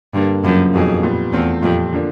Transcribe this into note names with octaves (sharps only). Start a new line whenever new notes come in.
G2 D3 G3 A#3
F#2 C#3 F3 A#3
F2 B2 F#3 A#3 D#4 G#4
A#2 G3 B3
E2 A3 C4 F4
F2 A#2 G3 C4
D3 F3 A#3 D4